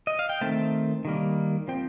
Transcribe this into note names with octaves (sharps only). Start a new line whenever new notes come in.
D#5
F5
G5
D#3 A3 C4 A5
D#3 G3 A#3
F3 C4 G5